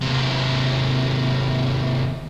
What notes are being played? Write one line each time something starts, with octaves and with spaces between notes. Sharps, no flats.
D#2 C3